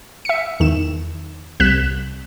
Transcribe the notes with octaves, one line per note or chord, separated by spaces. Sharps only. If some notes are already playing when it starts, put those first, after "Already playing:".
E5 C#7
E2 D#3 E7
C2 F#6 B6 E7